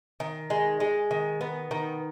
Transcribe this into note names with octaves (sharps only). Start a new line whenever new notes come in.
D#3
G#3
G#3
D#3
B3
D#3